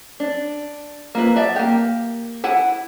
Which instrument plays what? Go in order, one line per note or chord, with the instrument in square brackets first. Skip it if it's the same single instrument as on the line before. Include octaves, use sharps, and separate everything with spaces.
[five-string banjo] D4
A#3 E4 F4 B4
B3 D5 E5 A5
A#3 G4
E4 F#5 G#5